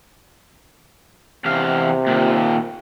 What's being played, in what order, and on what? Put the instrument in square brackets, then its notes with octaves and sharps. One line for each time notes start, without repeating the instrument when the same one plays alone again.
[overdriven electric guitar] E2 F5 [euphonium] C3
[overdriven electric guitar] A#2 D#3